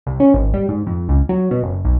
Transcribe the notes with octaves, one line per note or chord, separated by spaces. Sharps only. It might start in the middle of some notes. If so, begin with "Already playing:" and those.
C2
C#4
G#1
G3
G#2
F2
C#2
F#3
B2
F#1
B1